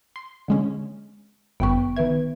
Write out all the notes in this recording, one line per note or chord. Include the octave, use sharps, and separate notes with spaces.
C6
D3 G#3 C#4
G1 F#2 B3 B4 G5 C#6
D#3 B3 B4 E5 G#6